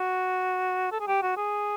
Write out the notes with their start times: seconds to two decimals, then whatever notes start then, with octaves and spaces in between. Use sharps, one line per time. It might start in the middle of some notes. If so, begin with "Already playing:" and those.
Already playing: F#4
0.92 A4
1.00 G#4
1.07 G4
1.22 F#4
1.37 G#4